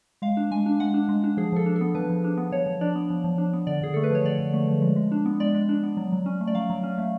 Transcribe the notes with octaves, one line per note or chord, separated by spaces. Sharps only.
G#3 F5
D4
G#3 G#5
D4
G#3 F#5
D4
G#3
D4
F3 G#4
F3 A4
D4
A4
B3
F3 B4
F3
D4
B3
F3 C#5
F3
D4 D5
B3
F3
F3
D4
B3
D3 D5
D3 G#4
A3 A4
B4
F3 C#5
D3 D5
D3
A3
F3
G#3
G#3
D4
B3
G#3 D5
G#3
D4
B3
F#3
F#3
C#4
A3
D5
F#3 F5
F#3
C#4
A3